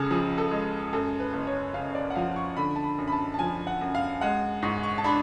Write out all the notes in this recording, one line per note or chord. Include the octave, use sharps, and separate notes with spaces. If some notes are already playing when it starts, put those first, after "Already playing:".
Already playing: C#2 C#3 G#4 A4
F3 G#4
A4
G#3
F#2 A4
B4
F#1
C#5
C#3 F5
D5
F#5
F3 F5
C#6
D3 B5
A5
B5
F#2
B5
A5
A5
F3 G#5
F#5
F#2
F5
G#3 F#5
G#2 C#6
C#6
A5
D4 B5